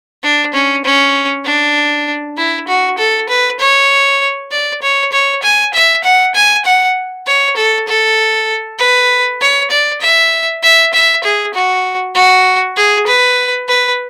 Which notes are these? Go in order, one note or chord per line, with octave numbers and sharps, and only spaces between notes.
D4
C#4
C#4
D4
E4
F#4
A4
B4
C#5
D5
C#5
C#5
G#5
E5
F#5
G#5
F#5
C#5
A4
A4
B4
C#5
D5
E5
E5
E5
G#4
F#4
F#4
G#4
B4
B4